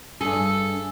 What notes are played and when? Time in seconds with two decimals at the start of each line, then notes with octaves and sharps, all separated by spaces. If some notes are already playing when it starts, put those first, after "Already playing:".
0.21 G2 G#4 A4